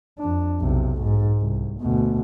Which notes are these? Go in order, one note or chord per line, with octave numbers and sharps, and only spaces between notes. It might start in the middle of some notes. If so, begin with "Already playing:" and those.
F2 D4
B1 C3
G#2
C2
D2 B2